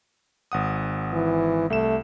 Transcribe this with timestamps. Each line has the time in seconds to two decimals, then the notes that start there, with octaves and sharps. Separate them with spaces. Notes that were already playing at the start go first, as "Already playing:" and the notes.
0.52 G#1 F#5 D#6
1.13 E3
1.70 C2 A3 E7